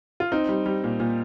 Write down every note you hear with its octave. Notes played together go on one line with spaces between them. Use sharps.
F4
C4 D#4
G3
G3
A#2
A#2